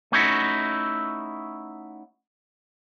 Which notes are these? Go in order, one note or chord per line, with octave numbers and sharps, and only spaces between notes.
A3 C#4 D#4 E4 F#4